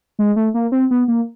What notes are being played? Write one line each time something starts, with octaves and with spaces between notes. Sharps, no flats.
G#3
A3
A#3
C4
B3
A#3